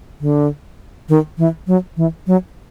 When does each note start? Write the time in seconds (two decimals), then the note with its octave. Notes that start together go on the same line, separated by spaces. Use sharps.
0.20 D3
1.09 D#3
1.38 E3
1.67 F#3
1.97 E3
2.27 F#3